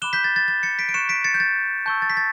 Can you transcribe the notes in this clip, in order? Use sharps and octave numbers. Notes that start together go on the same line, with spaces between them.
B5 D6 F#6 E7 G7
G6 B6
A6
A6
A6
A6 C#7
B6 D7
D7
C#6 F#6 C#7 E7
B6 D7
A6 C#7
G6
A6
A5 C#6 E6 G6
A6
B6
A6